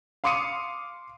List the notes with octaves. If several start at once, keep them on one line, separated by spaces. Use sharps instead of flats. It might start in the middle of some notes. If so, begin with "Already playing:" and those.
F5 C6 D6 D#6 C#7 D#7